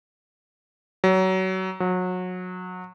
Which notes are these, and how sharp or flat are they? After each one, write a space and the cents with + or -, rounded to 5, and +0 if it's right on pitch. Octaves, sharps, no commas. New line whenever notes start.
F#3 +25
F#3 -25